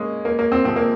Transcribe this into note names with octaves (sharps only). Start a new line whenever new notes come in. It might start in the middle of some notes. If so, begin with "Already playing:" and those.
Already playing: G#3 A#3 C#4
A#3
A#3
C4
C3 F3 G#3 C4
A#3